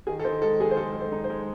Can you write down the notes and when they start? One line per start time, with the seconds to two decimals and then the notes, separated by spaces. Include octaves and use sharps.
0.07 D#3 G#4
0.19 A4
0.24 D#3 C5
0.42 G#3 A4
0.60 G#3 G#4
0.71 C5
0.77 G#3 A4
0.93 G#3 A4
1.01 C5
1.12 D#4
1.24 C5
1.30 G#3